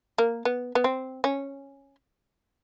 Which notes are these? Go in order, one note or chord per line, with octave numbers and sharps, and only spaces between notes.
A#3
B3
B3
C4
C#4